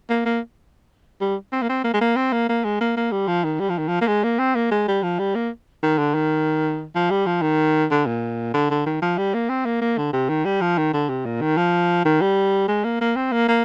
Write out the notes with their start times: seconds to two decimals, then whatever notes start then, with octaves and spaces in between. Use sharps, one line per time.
0.10 A#3
0.26 A#3
1.21 G3
1.53 C4
1.62 A#3
1.69 C4
1.84 A#3
1.94 G#3
2.01 A#3
2.16 C4
2.33 A#3
2.49 A#3
2.64 G#3
2.81 A#3
2.97 A#3
3.12 G3
3.28 F3
3.44 D#3
3.60 G3
3.70 F3
3.78 D#3
3.88 F3
4.01 A#3
4.07 G#3
4.24 A#3
4.39 C4
4.55 A#3
4.71 G#3
4.88 G3
5.03 F3
5.19 G3
5.35 A#3
5.83 D#3
5.99 D3
6.15 D#3
6.95 F3
7.11 G3
7.26 F3
7.42 D#3
7.91 D3
8.07 A#2
8.54 D3
8.70 D3
8.86 D#3
9.02 F3
9.18 G3
9.34 A#3
9.50 C4
9.65 A#3
9.82 A#3
9.98 D3
10.13 C3
10.29 D#3
10.45 G3
10.61 F3
10.78 D#3
10.94 D3
11.09 C3
11.25 A#2
11.41 D#3
11.57 F3
12.05 D#3
12.21 G3
12.68 G#3
12.84 A#3
13.01 A#3
13.16 C4
13.32 A#3
13.48 A#3